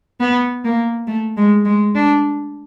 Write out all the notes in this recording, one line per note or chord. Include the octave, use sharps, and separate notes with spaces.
B3
A#3
A3
G#3
G#3
D4